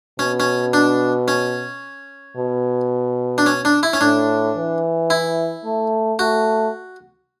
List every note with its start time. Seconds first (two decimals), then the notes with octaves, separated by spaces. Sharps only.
0.19 B2 C#4
0.40 C#4
0.73 D4
1.28 C#4
2.37 B2
3.38 D4
3.46 C#4
3.65 D4
3.83 E4
3.93 C#4
4.01 A2 D4
4.56 E3
5.10 E4
5.64 A3
6.19 A3 F#4